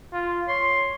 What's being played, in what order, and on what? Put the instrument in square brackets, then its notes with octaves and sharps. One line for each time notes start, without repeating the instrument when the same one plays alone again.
[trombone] F4
[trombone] C#5 [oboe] C6